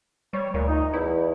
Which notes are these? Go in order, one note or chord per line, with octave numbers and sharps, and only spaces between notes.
G3 C#5
D2 A#2
D#4
E2 E4